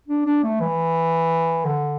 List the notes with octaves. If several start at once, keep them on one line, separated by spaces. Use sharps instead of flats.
D4
D4
A3
E3
D3